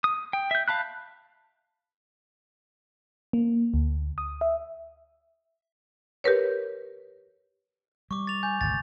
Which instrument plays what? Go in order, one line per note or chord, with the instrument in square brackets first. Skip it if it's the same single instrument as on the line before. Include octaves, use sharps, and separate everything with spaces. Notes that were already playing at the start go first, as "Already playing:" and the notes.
[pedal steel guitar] D#6
G5
E5 G6
F5 A5 B5 F#6
[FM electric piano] A#3
D2
D#6
E5
[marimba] G4 A#4 B4 C#5
[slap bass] G3 [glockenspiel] C#6 D6
[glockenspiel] A6 F7
[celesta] G#5 [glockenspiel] G6
[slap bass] G#1 D2 C3 [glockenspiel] A6